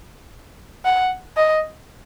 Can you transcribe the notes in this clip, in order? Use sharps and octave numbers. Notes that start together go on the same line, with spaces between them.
F#5
D#5